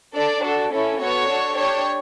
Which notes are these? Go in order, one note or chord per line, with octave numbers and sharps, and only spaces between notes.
D4 A4 D5
D4 F#4 A4
C#4 E4 A4
B3 F#4 A4 C#5
D4 F#4 A4
D4 G4 C#5